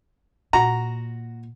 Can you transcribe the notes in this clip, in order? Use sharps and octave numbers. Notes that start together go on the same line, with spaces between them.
A#2 F#4 A#5